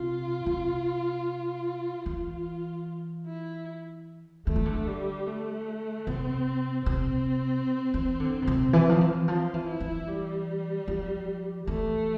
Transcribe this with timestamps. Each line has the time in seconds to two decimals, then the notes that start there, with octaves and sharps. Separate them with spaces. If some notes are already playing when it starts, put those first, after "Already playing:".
Already playing: C3 F4
0.46 C3
2.06 E3 F4
3.26 E4
4.47 D3 A3
4.56 E3
4.65 D3
4.87 G3
5.27 A3
6.07 C3 C4
6.86 C3 C4
7.94 E3
8.20 D3
8.42 B2
8.47 C3
8.73 E3
8.89 F3
9.01 E3
9.27 F3 F4
9.54 E3
9.67 E4
9.80 E3
10.08 G3
10.88 F3
11.67 E3 A3